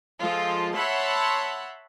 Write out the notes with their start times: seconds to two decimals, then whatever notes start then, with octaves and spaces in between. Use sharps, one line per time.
0.20 F3 G#3 F4 A4
0.74 C#5 E5 F#5 A5 B5 C6